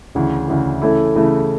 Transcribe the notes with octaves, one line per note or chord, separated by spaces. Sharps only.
D2 C#3 E3
D2 C#3 E3
C#3 E3 A3 E4
C#3 E3 A3 E4